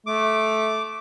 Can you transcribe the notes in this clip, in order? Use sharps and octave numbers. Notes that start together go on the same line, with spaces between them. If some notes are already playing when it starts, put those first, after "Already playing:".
A3 D6